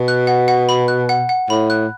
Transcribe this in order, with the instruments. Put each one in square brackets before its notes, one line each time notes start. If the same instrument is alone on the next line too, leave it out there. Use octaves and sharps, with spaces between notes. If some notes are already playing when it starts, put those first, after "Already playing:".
Already playing: [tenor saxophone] B2
[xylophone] F#6
F#5
F#5
B5
F#6
F#5
F#5
[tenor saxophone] A2 [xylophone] B5
[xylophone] F#6